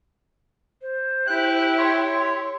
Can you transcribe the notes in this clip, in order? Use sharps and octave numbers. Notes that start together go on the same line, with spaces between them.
C5
E4 G4 F#6
C#5 C6